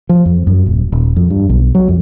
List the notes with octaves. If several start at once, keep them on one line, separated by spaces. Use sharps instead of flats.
F3
F2
F#2
D#1
D#1
F2
G2
B1
F#3
F2